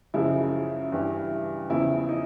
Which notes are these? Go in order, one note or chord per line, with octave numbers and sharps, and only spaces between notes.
F#2 C#3 F3 G#3 E4
G2 E3 G3
E2 C#3 F3 E4
D#4